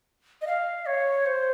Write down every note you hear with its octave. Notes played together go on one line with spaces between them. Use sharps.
D#5
F5
C#5
C5